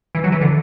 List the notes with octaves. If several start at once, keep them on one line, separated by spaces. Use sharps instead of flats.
E3
F#3
E3
D3